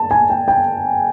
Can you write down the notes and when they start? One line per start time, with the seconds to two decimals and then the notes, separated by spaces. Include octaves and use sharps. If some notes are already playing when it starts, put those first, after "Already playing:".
Already playing: A5
0.11 G#5
0.30 G5
0.48 G5